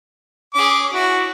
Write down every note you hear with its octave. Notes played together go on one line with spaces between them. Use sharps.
C#4 G#4 D6
E4 F#4